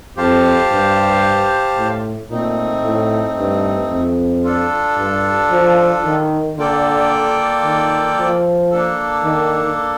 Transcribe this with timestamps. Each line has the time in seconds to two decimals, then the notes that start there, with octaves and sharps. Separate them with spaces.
0.17 F2 G4 C5 F5 A5
0.71 G2
1.77 A2
2.30 A#2 A3 C4 D#4
2.84 A2
3.37 G2
3.90 F2
4.44 D4 F4 A4
4.97 G2
5.51 F3
6.05 D#3
6.57 D3 A#3 F4 A4 D5 G5
7.64 D#3
8.18 F3
8.71 A#3 D4 A4
9.24 D#3